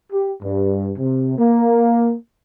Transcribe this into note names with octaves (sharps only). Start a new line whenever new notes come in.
G4
G2
C3
A#3